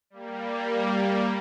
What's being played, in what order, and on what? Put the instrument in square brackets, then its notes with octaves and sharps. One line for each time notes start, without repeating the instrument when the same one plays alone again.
[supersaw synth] G3 A#3